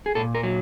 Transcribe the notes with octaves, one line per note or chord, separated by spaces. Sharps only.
G#4
A#2 A4
A#4
F#3